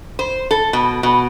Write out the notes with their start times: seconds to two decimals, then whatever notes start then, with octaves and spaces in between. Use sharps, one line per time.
0.19 C5
0.51 A4
0.73 B2
1.03 B2